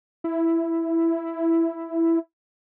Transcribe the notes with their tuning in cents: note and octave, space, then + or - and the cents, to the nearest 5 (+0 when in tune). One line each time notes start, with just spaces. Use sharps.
E4 +5